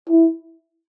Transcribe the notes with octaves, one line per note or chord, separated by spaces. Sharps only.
E4